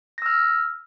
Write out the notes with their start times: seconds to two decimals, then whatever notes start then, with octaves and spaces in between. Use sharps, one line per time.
0.18 A#6
0.22 E6
0.26 F6